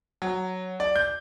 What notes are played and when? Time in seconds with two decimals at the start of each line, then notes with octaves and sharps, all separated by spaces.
0.22 F#3
0.80 D5
0.96 G6